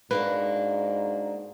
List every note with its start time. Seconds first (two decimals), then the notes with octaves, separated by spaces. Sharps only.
0.11 G#2 A#3 D4 F#4 B4